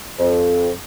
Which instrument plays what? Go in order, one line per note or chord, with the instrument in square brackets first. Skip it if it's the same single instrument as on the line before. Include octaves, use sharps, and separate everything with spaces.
[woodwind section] F2